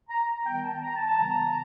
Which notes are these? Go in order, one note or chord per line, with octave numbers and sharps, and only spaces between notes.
A#5
D#3 G3 B3 G5
A5
A#5
A5
A5
C#3 E3 G3 B3 A#5